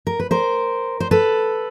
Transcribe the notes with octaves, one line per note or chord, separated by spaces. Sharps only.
A#4
B4
A#4 C5
C5
A4 B4